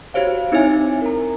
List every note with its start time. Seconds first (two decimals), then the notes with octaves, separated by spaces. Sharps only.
0.14 F#4 G4 C5 C#5 F5
0.52 C4 D#4 E4 C#5 E5 G#5
1.02 A#4 A#5